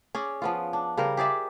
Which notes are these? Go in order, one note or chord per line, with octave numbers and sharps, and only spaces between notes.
C#4 G#4 D5
F3 B3 F4
D4
C#3 G3 A#4 C5
G4 G#4 D5 E5